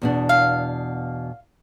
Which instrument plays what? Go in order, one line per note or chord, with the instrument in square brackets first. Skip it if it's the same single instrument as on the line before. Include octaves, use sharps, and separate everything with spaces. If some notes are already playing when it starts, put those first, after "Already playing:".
[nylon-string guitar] E2 B2 D4
[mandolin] F5